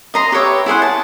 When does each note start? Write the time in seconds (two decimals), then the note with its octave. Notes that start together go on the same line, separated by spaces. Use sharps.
0.14 D#5 A#5 C6
0.32 G4 B4 C#5 E5
0.66 E4 G#4 C5 F#5
0.82 A5